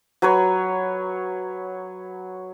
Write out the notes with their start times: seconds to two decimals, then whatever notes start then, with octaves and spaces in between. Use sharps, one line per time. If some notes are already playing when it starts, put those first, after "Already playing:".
0.22 F#3 B4 C#5